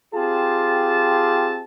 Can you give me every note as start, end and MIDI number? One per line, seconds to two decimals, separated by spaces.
0.14 1.64 60
0.14 1.64 65
0.14 1.64 67
0.14 1.64 68
0.14 1.64 81